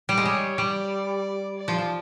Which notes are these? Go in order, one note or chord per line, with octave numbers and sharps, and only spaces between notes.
G3
G#3
G3 C#5
G3 D5
D5
F3
F3